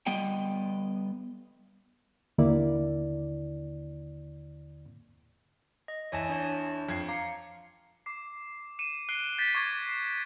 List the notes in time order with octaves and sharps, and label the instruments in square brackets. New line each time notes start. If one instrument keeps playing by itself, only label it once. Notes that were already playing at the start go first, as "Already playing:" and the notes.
[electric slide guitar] G3 B3 D#5 G5
[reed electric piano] D#2 D3 A#3 E4 D5
[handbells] D#5
[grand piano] E2 E4 [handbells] C#5 G#5 A5
[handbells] D4 C#5 A5
[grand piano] F2 G#6 C7
[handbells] F5 C7 C#7 [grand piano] A#5 D6
[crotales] D6 C7
C#7 D#7 E7
F#6 C7 D7 G7
G6 A6 B6
C#6 D6 G#6 A#6
C7 D#7